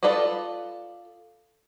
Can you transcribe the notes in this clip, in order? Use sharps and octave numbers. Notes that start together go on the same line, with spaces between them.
F4 A4 B4 D5 D#5